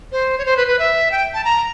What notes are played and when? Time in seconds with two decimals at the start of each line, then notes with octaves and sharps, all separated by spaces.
0.12 C5
0.38 C#5
0.45 C5
0.57 B4
0.67 B4
0.79 E5
1.11 G5
1.34 A5
1.44 A#5